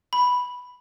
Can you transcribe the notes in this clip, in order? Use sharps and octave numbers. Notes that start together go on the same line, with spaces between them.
B5